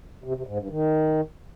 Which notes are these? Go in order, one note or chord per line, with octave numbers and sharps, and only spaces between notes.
C3
C3
G#2
G2
D#3